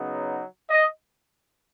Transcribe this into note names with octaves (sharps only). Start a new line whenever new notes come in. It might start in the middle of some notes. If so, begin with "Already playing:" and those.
Already playing: C#3 F#3 B3 D#4
D#5